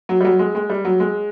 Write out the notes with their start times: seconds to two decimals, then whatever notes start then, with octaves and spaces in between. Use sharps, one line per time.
0.09 F#3
0.21 G3
0.25 F#3
0.39 G#3
0.55 G#3
0.70 G3
0.85 F#3
1.00 G#3